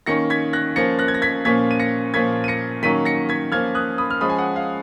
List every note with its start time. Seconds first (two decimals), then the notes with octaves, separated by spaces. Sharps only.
0.06 D#3 A#3 C#4 A#6 C#7
0.30 G#6 B6
0.53 F#6 A#6
0.76 F3 A#3 C#4 A#6 C#7
0.99 F#6 A#6
1.08 G#6
1.14 A#6
1.22 G#6 B6
1.45 A#2 F3 A#3 C#4 G#6 B6
1.71 D#7
1.80 A#6 C#7
2.14 A#2 F3 A#3 C#4 G#6 B6
2.44 D#7
2.48 A#6 C#7
2.83 D#3 F#3 A#3 C#4 B6 D#7
3.05 A#6 C#7
3.29 G#6 B6
3.52 F3 A#3 C#4 F6 G#6
3.75 D#6 F#6
3.98 B5 D#6
4.11 F6
4.21 F3 G#3 C#4 B5 D#6
4.30 G#5
4.38 F#5
4.56 F5